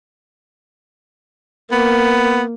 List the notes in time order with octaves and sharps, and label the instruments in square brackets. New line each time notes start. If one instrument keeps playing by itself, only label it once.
[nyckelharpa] A#3 [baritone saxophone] B3